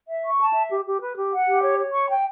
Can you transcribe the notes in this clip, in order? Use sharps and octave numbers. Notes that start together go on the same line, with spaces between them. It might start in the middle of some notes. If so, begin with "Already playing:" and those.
E5
C#6
A5
E5
G4
G4
B4
G4
F#5
G4
C#5
C#5
C#6
G5